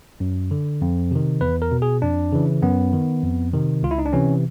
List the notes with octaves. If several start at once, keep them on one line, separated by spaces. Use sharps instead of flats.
F#2
D3
F2
C3 D#3
E2 B4
A#4
B2
G#4
F2 D4
C#3 E3
F#2 B3
D#3
F2
C3 D#3
C#2 F4
E4
D#4
D4
C3 E3 C#4